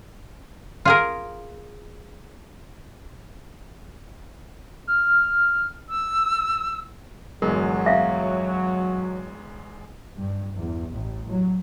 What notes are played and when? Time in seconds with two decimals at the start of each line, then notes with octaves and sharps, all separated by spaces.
0.85 F4 G#4 A#4
4.87 F6
5.89 E6
7.42 G1 E2 F#3 G#3 A#4
7.86 E5 F5
10.18 G2
10.53 E2
10.91 A1
11.29 F#3